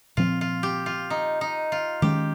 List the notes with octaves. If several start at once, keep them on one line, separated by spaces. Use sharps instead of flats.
A#2 F3 C4 F4
F4
G4
F4
D#4
D#4
F4
D#3 G#3 C#4 G4